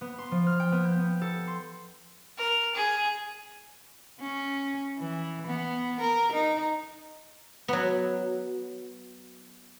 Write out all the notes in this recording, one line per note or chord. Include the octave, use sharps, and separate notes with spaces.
B3
C6
F3
F6
G5
B3
G6
B3
A4
C6
A#4
G#4
C#4
E3
B3
A#4
D#4
F#3 B3